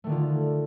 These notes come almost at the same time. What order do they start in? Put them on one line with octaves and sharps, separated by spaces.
A3 D#3 D3 F4